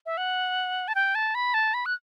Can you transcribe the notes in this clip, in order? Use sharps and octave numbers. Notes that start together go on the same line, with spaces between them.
E5
F#5
A5
G5
A5
B5
A5
B5
F#6